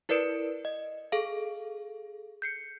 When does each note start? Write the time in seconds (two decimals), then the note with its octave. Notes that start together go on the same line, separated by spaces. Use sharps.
0.09 E4 A#4 B4 D5 C#7 D7
0.65 D#5
1.12 G#4 A4 F5
2.42 G6 C7 C#7